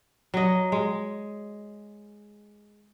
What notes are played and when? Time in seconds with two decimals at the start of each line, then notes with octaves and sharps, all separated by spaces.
0.34 F#3 D#5
0.72 G#3